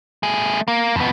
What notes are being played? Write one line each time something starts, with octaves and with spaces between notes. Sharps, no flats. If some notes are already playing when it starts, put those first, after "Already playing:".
A3 G#4
A#3
F2 B3